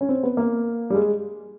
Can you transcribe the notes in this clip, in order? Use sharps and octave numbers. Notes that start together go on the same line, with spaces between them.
C#4
C4
B3
A#3
G3
G#3